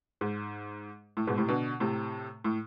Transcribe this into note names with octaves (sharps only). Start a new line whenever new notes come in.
G#2
A2
G#2 B2
A2 C3
B2 D3
A2 C3
A2